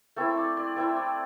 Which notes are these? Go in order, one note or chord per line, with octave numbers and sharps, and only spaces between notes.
A3 C4 E4 A4
D5
D5
A3 C4 E4 E5
D5